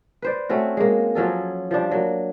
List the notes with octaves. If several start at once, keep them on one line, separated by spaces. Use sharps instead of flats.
B4 C5 D5
A3 C4 C#4 F#4
G#3 A#3
F3 F#3 C#4 A4
F3 G3 D4
F#3 A#3